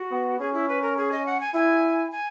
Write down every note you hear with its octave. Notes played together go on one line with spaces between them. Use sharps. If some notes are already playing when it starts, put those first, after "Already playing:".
Already playing: F#4
B3
C#4 G#4
E4
B4
A#4
G#4
D#5
F#5
G#5
E4 G#5
G#5